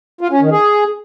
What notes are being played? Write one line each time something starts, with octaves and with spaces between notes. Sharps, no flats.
F4
C#4
D#3
G#4